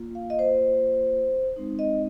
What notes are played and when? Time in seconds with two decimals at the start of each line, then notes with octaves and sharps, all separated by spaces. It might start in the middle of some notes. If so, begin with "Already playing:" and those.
Already playing: A#3 F4
0.15 F5
0.30 D#5
0.39 C5
1.56 G#3 C4 D#4
1.79 D#5